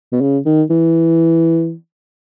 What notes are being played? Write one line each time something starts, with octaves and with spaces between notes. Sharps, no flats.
B2
C#3
D#3
E3